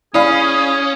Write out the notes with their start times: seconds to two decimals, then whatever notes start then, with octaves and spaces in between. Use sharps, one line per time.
0.14 C#4 E4 G#4 D5 F5 B5 D#6